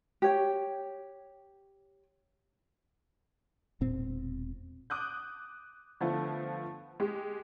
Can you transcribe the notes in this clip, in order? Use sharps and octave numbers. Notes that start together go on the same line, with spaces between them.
G4 C#5 G5
E1 A#2 C4
D6 D#6 F#6 G6
D3 F3 A3 B3
G#3 G4